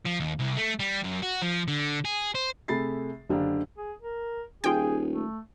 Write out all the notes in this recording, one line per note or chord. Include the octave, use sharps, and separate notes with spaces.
F3
D#2
C2
A3
G3
F#2
F#4
F3
D3
G#4
C5
C3 A3 G#4 B5 A6 C7
F#1 D3 D4 G4 F5
G#4
A#4
D#1 F4 G#4 G5
A3